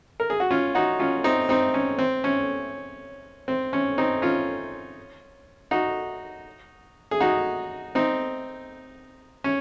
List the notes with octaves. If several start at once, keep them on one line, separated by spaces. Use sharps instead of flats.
A#4
G#4
F#4
C#4 F4
D#4 F#4
C#4 F4
C4 D#4
C4 D#4
C#4
C4
C#4
C4
C#4
C4 D#4
C#4 F4
D#4 F#4
G#4
D#4 F#4
C4 D#4
C#4